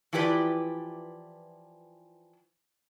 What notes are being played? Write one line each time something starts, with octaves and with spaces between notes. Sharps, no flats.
E3 F3 E4 G4 B4 D5